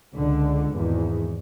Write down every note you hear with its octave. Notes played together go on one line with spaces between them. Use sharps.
C#2 D3
G#1 E2